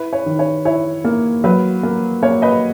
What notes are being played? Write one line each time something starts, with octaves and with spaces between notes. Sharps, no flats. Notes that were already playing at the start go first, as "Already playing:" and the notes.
Already playing: E4 B4
C#5
D#3
C#5
E4 C#5
A#3
F#3 B4
A#3
A#3 C#5
B4 D#5